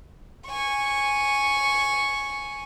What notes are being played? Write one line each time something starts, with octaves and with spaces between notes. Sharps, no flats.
G#5 C#6